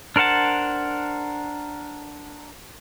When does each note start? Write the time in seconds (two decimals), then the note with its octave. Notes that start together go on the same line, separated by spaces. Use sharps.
0.16 D4 A#4 C5 F#5 A5